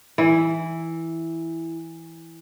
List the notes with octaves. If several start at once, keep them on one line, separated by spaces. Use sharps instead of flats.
E3 E4